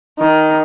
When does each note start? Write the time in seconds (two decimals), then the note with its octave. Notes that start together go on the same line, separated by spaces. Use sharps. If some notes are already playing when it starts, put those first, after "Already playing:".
0.19 D#3